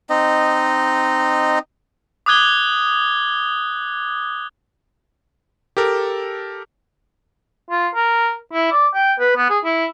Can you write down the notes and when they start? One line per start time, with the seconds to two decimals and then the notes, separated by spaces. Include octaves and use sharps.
0.10 C4 D#4 D#5
2.26 D6 D#6 F#6 G#6 G7
5.77 G4 A4 A#4
7.70 F4
7.95 A#4
8.53 E4
8.72 D5
8.95 G5
9.20 B4
9.36 B3
9.50 G#4
9.65 E4